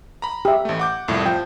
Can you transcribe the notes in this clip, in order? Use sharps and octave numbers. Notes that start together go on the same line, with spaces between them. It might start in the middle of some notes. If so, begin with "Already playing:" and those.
A#5 B5
G4 E5
A1 A3
F#5 D6 G6
C2 F2 A2
F3 G5